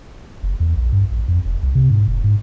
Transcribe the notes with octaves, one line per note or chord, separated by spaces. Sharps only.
F#1
E2
A#1
G2
A1
F2
F1
C2
C3
G#2
F1
G#2